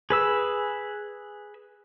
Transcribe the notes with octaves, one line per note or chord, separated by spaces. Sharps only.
G#4 B4 E6